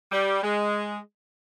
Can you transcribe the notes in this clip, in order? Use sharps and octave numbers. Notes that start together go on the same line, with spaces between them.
G3
G#3